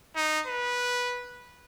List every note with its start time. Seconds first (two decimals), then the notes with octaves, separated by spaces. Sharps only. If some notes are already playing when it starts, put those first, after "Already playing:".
0.16 D#4
0.47 B4